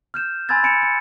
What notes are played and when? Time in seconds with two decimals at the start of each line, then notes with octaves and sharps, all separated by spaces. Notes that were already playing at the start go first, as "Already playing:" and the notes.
0.14 F6 G6 E7
0.49 G#5 B5 C6 E6 G#6 A6
0.63 G#5 B5 C#7 D7 E7
0.82 C#7